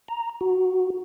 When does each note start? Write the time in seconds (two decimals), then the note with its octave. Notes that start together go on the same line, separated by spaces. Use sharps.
0.08 A#5
0.41 F#4